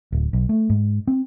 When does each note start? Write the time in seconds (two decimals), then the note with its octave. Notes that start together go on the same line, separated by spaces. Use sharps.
0.12 D1
0.33 B1
0.49 A3
0.70 G#2
1.07 C4